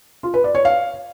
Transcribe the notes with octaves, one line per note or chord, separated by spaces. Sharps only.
F4
B4
D5
C#5
F5